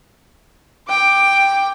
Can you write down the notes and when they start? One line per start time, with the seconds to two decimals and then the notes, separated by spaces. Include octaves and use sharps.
0.88 G5 D6